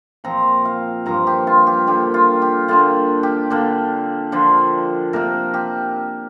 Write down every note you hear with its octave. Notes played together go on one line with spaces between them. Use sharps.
A#2 F3 C4 A#5
F5
G2 F3 A#3 A#5
G4
F4
G4
D3 A#3 D4 G4
F4
G4
D3 A#3 D4 F4
G4
D3 A#3 D4
D3 F3 D4
C3 A#3 D4 A#4
G4